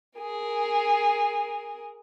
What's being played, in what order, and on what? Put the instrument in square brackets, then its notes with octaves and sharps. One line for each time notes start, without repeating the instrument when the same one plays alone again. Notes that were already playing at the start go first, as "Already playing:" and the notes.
[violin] G#4 A#4